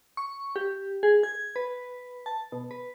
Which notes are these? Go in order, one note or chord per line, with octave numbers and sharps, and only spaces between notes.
C#6
G4
G#4
G#6
B4
A5
B2
B4